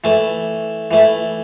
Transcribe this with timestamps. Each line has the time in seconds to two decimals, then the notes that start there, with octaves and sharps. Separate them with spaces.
0.04 E3 A3 E4
0.91 E3 A3 E4